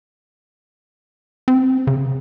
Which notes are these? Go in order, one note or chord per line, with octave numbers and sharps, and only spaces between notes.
C4
C#3